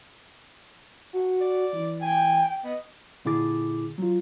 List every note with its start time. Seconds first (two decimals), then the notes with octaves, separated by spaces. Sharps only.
1.13 F#4
1.41 D5
1.73 E3
2.02 G5 G#5
2.64 B3 D#5
3.25 A#2 D3 E4 G#4 D6 A6
3.98 F#3 F4